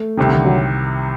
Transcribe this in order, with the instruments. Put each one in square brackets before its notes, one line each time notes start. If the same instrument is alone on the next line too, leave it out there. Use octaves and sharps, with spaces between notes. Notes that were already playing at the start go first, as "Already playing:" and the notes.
Already playing: [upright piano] A3
[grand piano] C2 C3 D#3
[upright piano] D3
D#3
F#3